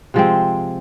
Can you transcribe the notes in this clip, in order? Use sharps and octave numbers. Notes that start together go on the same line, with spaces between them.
C3 F3 G#3 C4